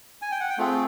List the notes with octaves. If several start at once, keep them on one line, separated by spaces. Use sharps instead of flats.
G#5
G5
F#5
G5
A3 C4 F4 G#4